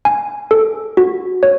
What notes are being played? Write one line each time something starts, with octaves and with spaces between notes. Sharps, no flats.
G#5
A4
F#4
C#5